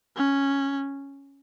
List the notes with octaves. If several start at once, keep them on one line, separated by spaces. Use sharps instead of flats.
C#4